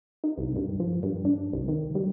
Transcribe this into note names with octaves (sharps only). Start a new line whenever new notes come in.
D#4
C2
G2
F3
G2
D4
C2
D#3
G3